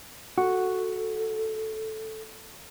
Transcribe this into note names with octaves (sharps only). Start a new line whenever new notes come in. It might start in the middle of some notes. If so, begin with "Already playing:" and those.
F#4 A4